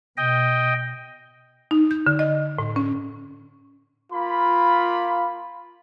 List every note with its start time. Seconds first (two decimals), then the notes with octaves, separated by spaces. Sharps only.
0.17 B2 D#5 G5
1.71 D#4
1.91 G6
2.07 D3
2.19 D#5
2.59 A2
2.76 C#4
4.12 A#3 F4 B5